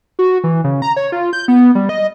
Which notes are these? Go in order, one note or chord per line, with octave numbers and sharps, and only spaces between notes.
F#4
E3
C#3
A#5
C#5
F4
G6
B3
G3
D#5